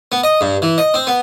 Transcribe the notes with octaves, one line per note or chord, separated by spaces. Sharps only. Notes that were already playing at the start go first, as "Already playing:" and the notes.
B3
D#5
G2
E3
D#5
C4
B3